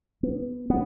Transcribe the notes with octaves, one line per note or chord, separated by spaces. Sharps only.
B3
B3